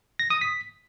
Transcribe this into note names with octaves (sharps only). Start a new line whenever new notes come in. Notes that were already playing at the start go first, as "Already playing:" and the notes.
A#6
D#6
B6